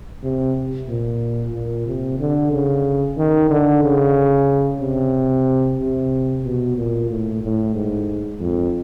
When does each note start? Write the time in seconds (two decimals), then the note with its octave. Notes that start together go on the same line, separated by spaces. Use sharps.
0.23 C3
0.88 A#2
1.54 A#2
1.86 C3
2.19 D3
2.52 C#3
3.17 D#3
3.50 D3
3.83 C#3
4.81 C3
5.79 C3
6.44 B2
6.77 A#2
7.10 A2
7.42 A2
7.75 G#2
8.40 F2